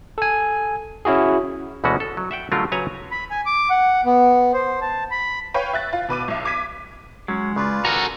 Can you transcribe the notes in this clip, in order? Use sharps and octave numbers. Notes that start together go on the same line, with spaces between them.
A4 G#5
C#4 E4 F#4 G#4
D2 B2 E3 G#3 C#4 F#4
A4
F#3
E5 F#5 G5
D3 F#3 G3 A3 F4 A#4
C#3 F#3 B4 C#5 G#5 A#5
B5
G#5
D6
F#5
B3
C5
A5
B5
B4 C#5 F5 G5
E5 F#6 A6
F4
B2 B4 D6 D#7
B1 E5
D6 G#6 B6 D#7
F#3 G#3 C#4 F#5
C#3 F4 B4 D5
F#4 A4 A#4 G#5 A#5